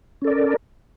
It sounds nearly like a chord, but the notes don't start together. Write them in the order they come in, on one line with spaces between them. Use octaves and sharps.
C#4 A4 D5 A#4